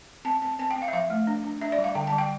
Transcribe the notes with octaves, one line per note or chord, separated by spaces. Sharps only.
C4 A5
C4 A5
C4 A5
G5
C4
F5
E5
F3 F5
A3
D4
D4
D4 E5
D5
G3
F5
D3 G5
A5
G3
G5